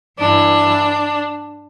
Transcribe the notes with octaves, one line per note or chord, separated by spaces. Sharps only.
G2 E3 D4